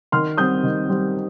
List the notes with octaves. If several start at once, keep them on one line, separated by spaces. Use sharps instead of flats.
D#3 C6 F6
G3 C4 D#6 G6
D#3
G3 C4